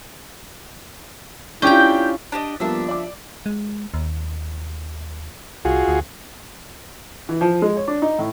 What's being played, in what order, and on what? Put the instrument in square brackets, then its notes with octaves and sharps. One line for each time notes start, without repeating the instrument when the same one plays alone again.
[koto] C#4 G5 [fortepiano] D4 G4 [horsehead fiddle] E4 F4 [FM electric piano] G6
[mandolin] D4 G4 D#5
[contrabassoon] F3 [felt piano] G3 A#3 B3 [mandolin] D4 E5
[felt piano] D5 D6
[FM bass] G#3
D#2
[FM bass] C2 [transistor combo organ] F4 F#4 G#4
[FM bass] D2
[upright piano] E3
F3
G#3
C#5
D4
D#4
A2